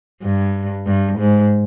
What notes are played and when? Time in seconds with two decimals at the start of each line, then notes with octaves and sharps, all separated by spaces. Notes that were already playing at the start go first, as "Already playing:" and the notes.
0.22 G2
0.86 G2
1.19 G#2